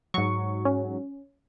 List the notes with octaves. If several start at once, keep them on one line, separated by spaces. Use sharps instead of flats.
G#2 F#3 C#6
C#4